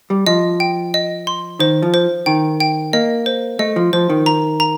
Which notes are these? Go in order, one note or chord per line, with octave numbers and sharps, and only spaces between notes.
G3
F3 D#5
G5
D#5
C6
D#3 C5
F3
C5
D#3 G5
G5
A#3 D#5
C5
A3 D#5
F3
F3 C5
D#3
A#5
A#5